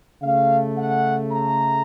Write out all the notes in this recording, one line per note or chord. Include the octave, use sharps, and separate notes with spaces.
C#3 A3 F5
F#5
A#5